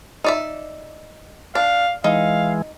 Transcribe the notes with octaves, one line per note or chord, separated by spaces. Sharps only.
D#4 D5 E5
D4 F5
E3 G#3 D#4 F5